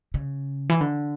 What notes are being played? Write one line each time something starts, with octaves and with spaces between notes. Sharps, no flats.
C#3
E3
D3